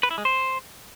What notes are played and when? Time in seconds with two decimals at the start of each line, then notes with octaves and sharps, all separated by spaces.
0.03 B4
0.11 E4
0.18 G#3
0.25 C5